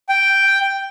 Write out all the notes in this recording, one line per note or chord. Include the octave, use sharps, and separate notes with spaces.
G5